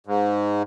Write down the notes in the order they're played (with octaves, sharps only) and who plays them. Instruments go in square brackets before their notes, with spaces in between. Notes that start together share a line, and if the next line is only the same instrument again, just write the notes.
[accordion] G#2